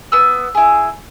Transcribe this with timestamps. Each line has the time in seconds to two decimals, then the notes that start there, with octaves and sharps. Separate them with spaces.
0.12 B3 E6
0.55 E4 G#4